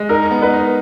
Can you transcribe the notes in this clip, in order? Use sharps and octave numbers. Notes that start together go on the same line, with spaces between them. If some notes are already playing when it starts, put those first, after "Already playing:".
Already playing: G#3
D#4 A#4
B3
B4
D#4